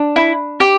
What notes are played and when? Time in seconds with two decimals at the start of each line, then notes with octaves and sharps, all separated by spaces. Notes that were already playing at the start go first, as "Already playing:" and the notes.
Already playing: D4
0.16 E4
0.60 G4